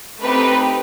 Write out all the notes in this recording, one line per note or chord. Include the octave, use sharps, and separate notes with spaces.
A3 C4 D#4 G4 B4